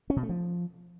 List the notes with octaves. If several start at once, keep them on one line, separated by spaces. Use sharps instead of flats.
C#4
B2
A3
F3